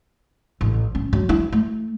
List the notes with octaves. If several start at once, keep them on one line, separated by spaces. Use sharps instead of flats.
A1
C#4
F#3
E4
A3